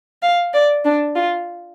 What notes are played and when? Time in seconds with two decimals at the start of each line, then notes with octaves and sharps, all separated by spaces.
0.22 F5
0.54 D5
0.84 D4
1.15 F4